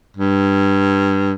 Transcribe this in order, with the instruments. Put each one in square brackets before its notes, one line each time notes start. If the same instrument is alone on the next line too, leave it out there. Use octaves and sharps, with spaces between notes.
[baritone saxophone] G2